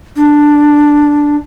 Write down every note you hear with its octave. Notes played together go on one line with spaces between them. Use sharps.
D4